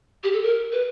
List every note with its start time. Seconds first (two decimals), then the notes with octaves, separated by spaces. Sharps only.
0.24 G4
0.33 A4
0.43 A#4
0.72 B4